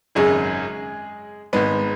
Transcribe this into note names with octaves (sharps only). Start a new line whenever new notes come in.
G#1 F#2 C#3 F#3 G#3 G#4
G#1 G#2 G#3 B3 B4